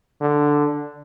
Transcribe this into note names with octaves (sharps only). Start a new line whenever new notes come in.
D3